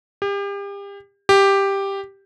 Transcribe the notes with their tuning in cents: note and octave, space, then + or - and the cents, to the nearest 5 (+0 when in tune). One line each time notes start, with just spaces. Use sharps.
G4 +35
G4 +5